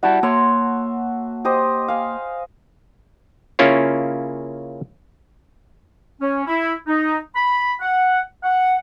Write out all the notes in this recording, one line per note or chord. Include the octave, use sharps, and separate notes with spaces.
G3 E4 F#4 D5 A5
A#3 C#5 E5 C6
G4 C5 D#5
F5 G#5
C#3 A#3 C#4 E4 F4 C#5
C#4
E4
D#4
B5
F#5
F#5